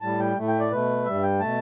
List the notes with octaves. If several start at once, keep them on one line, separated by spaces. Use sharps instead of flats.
A2 G3 A5
G5
A2 A3
G5
D5
B2 A3 B4
G2 G3 E5
G5
B2 A3 A5